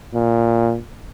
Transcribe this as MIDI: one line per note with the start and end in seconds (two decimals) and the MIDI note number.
0.14 0.77 46